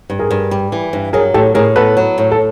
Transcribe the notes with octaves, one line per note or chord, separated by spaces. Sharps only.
G2
G#4 A#4
G2
G3
E3
G2
F#3 G#4 A#4
A2 G4 A4
A2 G#4 A#4
B3 A4 B4
F#3
A2
A4